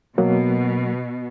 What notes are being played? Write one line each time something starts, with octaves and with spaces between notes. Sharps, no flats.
B2 F#3 A#3